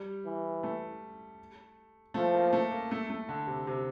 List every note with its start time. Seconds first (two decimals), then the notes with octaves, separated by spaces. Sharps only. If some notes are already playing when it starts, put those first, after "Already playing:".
Already playing: G3
0.25 E3
0.63 A3
2.14 F3 A3
2.34 A#3
2.53 A3
2.72 A#3
2.91 A3
3.10 A3
3.29 D3
3.47 C3
3.67 C3